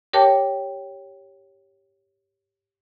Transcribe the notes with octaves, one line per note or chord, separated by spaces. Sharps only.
G4 A#4 C#5 G5 A5 D6